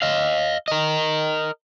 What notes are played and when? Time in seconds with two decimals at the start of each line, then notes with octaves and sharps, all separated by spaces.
0.02 D#5 F5
0.68 A#4 D#5